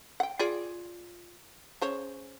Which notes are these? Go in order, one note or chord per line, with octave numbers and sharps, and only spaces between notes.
F#5 G5
F4 G#4 D5
C#3 C5 C#5